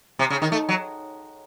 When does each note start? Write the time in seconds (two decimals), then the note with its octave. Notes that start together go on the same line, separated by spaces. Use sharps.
0.19 C3
0.30 C#3
0.42 D#3
0.52 A3
0.69 F#3